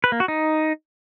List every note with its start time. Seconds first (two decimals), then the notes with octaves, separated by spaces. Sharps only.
0.04 B4
0.12 A#3
0.20 F#4
0.28 D#4